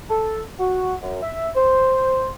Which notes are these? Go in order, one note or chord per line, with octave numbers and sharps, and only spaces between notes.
A4
F#4
F#2
E5
C5